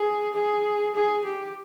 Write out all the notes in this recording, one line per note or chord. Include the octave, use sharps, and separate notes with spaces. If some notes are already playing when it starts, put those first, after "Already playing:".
Already playing: G#4
G#4
G#4
G4